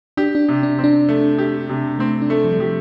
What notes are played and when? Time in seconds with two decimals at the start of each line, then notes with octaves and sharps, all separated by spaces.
0.17 D4 G4
0.35 D4
0.49 C3
0.63 D4
0.79 C4
0.84 D4
1.09 A3
1.38 G4
1.69 C3
1.99 A3 C4
2.22 D4
2.30 A3
2.44 F3
2.52 G3
2.59 F3 G4